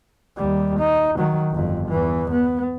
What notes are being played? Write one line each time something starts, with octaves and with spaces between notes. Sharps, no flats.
D#2 G3
D#4
D#3 F#3
G1 F2
E2 E3
B3